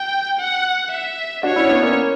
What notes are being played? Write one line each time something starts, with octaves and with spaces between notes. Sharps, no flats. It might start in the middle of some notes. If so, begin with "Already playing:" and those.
Already playing: G5
F#5
E5
D4 F#4 C#5
C#4 E4
B3 D4
A#3 C#4